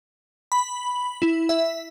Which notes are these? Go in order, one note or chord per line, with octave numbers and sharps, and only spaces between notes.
B5
E4
E5